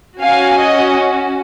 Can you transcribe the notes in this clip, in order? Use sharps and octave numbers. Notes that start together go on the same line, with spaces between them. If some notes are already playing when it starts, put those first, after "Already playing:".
C#4 F#4 F5 G#5
D#5